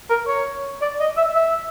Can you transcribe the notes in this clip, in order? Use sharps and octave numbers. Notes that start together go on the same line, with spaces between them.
A#4
C#5
D5
D#5
E5
E5